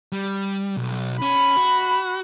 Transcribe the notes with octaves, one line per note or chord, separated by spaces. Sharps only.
G3
B1
C#4 B5
F#4